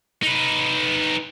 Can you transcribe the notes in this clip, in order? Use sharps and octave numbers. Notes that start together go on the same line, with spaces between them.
D#4 B4